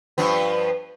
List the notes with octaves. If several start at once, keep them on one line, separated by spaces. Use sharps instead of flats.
G2 F3 B3